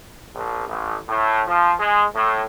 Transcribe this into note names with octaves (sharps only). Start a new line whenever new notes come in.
A#1
A1
A2
F3
G#3
A2